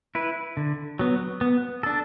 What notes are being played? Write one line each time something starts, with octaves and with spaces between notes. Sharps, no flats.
E4 B4
D3
F#3 B3
B3
D4 A4